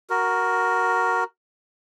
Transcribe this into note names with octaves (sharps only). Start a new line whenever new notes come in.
F#4 A#4